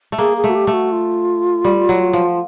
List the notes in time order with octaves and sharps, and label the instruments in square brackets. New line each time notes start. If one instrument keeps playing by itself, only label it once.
[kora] A3
[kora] A#3 [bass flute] G#4
[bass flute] G#4
[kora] A3
[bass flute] F#4
G4
[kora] A3
[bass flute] F#4
F4
[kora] G3
F#3
F3